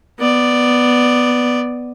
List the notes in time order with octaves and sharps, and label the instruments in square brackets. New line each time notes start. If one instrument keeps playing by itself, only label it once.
[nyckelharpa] B3 D5